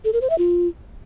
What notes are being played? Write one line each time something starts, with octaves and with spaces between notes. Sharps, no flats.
A4
A#4
C5
E5
F4